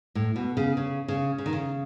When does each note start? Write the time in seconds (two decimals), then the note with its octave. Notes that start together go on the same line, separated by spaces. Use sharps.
0.15 A2
0.36 B2
0.57 C#3
0.77 C#3
1.08 C#3
1.38 C#3
1.46 D#3
1.53 C#3